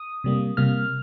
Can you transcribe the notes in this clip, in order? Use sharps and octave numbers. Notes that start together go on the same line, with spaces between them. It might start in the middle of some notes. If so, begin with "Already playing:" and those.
Already playing: D#6
C3 G3 A#3
C3 G3 A#3 F6